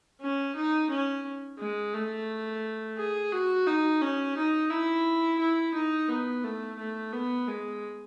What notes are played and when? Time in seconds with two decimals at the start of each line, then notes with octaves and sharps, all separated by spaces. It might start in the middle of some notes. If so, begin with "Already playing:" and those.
0.21 C#4
0.55 D#4
0.91 C#4
1.59 G#3
1.94 A3
2.97 G#4
3.32 F#4
3.67 D#4
4.01 C#4
4.37 D#4
4.70 E4
5.40 E4
5.74 D#4
6.09 B3
6.44 A3
6.79 A3
7.13 B3
7.47 G#3